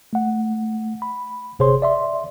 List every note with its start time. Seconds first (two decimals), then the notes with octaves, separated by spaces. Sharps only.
0.13 A3 F#5
1.02 B5
1.59 G1 C3 G#4 C5 C#5 C6
1.82 D5 E5 C6